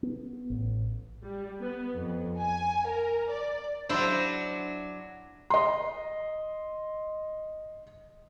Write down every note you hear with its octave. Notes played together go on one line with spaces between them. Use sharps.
B3
A1
G3
B3
F2
G#5
A#4
D5
F#3 D4 E4 C5 C6
D#5 C6